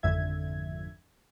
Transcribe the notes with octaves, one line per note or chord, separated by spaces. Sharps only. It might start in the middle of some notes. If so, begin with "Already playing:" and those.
G#1 F2 D3 E5 G#6